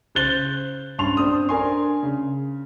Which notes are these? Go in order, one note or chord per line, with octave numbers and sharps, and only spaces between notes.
C#3 C5 F#6 A6 G7
G2 C#4 A5 C6 F7
C4 D4 D#6
D4 A#4 G#5 C6
C#3